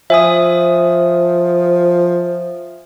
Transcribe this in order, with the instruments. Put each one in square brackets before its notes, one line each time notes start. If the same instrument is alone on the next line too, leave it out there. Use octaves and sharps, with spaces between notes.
[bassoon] F3 [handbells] E5 G#5 D#6